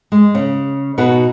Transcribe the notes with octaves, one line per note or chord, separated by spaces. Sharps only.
G#3
C#3
B2 D#4 F#4 B4